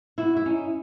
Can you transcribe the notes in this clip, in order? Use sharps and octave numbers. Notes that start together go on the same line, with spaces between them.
E4 F#4
E4
C#4 D#4